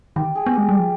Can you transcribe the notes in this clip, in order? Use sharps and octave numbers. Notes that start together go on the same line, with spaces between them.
D#3 G4
G#4
B3
G#3 G4
G3
F3